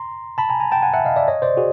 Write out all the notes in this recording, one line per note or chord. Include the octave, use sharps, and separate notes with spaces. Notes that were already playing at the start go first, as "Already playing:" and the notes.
Already playing: A#5 C6
A5 B5
G#5 A#5
G#5 A#5
G5 A5
F#5 G#5
E5 F#5
D#5 F5
D5 E5
C#5 D#5
C5 D5
F#4 G#4